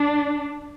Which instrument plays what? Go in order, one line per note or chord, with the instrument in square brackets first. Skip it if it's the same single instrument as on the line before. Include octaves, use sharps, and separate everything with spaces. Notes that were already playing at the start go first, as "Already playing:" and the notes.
Already playing: [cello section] D4